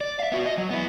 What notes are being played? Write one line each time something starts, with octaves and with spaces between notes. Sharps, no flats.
D5
E5 F5
B3 F#4
D#5
F#3
B3 E4